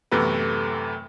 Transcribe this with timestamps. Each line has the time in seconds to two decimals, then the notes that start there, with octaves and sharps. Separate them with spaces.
0.11 F#2 A2 C3 E3 A3 B3